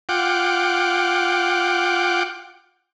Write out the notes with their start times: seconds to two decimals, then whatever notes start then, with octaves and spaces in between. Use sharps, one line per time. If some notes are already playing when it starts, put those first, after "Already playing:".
0.09 F4 F#5 G5 D6